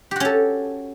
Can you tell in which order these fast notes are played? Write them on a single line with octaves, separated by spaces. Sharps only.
G4 F#4 C#4 A4